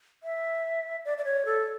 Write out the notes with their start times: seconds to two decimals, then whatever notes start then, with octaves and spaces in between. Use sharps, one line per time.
0.23 E5
1.05 D5
1.18 D5
1.25 C#5
1.46 A4